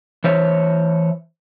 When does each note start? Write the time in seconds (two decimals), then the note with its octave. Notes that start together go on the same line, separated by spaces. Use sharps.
0.24 E3 C5 C#5 E5